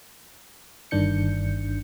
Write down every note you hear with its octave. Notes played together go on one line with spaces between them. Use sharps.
G1 G2 D#3 D4 G6 C#7